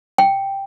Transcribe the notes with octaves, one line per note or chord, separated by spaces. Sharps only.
G5